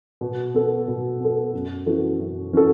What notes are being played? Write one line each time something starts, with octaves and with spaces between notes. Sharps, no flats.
B2
B3 A4
B2
B3 A4
F#2
E3 C#4 F#4 A4
F#2
E3 C#4 F#4 A4